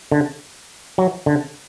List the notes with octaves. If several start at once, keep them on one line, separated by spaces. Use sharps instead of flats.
D3
F#3
D3